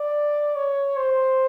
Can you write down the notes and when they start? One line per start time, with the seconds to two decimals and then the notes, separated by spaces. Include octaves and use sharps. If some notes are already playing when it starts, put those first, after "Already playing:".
Already playing: D5
0.56 C#5
0.97 C5